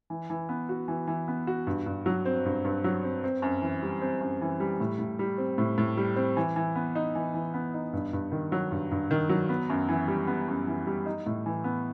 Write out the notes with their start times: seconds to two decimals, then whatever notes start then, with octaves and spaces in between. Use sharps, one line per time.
0.10 E3
0.30 E3
0.49 B3
0.69 F#4
0.88 E3
1.07 E3
1.28 B3
1.47 F#4
1.67 G2
1.86 G2
2.06 F#3
2.25 C4
2.45 G2
2.65 G2
2.84 F#3
3.04 C4
3.24 C4
3.42 F#2
3.62 E3
3.83 G3
4.01 C4
4.21 F#2
4.41 E3
4.60 G3
4.80 A2
4.99 A2
5.19 G3
5.38 C4
5.58 A2
5.78 A2
5.97 G3
6.16 C4
6.37 E3
6.56 E3
6.75 B3
6.95 D#4
7.15 E3
7.34 E3
7.54 B3
7.74 D#4
7.93 G2
8.13 G2
8.32 D#3
8.52 F#3
8.72 G2
8.91 G2
9.11 D#3
9.29 F#3
9.49 B3
9.69 F#2
9.89 E3
10.08 G3
10.27 B3
10.48 F#2
10.67 E3
10.87 G3
11.06 D#4
11.26 A2
11.46 E3
11.64 B3